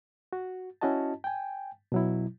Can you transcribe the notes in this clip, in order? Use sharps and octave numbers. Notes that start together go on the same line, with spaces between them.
F#4
C#4 E4 F#4 D#5 A5
G5 G#5
B2 F#3 E4